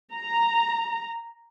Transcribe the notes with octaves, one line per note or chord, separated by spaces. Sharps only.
A#5